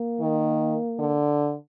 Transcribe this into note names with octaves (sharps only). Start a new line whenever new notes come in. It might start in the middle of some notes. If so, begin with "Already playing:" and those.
Already playing: A#3
D#3
D3